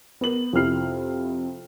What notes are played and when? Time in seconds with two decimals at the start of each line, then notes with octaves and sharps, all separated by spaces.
0.21 B3 A#4 F#7
0.53 F2 C3 E4 F6 C7